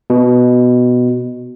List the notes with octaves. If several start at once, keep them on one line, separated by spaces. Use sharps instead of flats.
B2